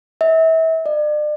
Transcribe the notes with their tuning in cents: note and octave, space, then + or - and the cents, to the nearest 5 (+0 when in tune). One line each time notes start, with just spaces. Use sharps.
E5 -30
D5 +40